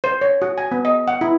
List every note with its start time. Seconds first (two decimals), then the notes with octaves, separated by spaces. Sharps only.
0.04 C5
0.21 C#5
0.42 F#4
0.58 G#5
0.72 B3
0.85 D#5
1.08 F#5
1.21 E4